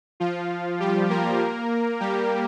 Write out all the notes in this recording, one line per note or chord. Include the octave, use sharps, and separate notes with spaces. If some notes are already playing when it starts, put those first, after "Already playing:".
F3 F4
G3 G4
A#3 A#4
G3 G4